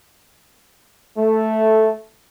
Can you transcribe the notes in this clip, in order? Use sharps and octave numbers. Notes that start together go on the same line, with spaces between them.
A3